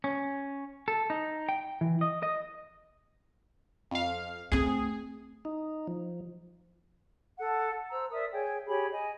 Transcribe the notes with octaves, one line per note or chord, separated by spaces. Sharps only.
C#4
A4
D#4
G5
E3
D#5
D#5
F2 F5
A3 C4 G#4
D#4
F3
A4 F#5
C5 A#5 E6
A#4 D5 E5 D#6
G#4 C#5 G5
G4 G#4 C#5 B5
D#5 G#5